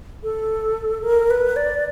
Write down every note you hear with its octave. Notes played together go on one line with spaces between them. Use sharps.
A4
A#4
B4
D5